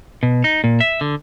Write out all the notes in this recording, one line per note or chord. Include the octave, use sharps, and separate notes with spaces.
B2
D#4
A#2
E5
D3